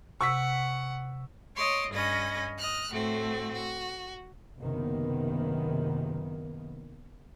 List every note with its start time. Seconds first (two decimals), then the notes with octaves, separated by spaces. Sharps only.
0.21 C3 F#5 C#6 E6 B6
1.56 C#5 D#5 C6 D6
1.91 G2 C#4 D#5 B5 A#6
2.58 D#5 F6 F#6
2.90 A2 A3 C4 F#4
3.52 F#4
4.60 F#1 C3 D#3 A#3 B3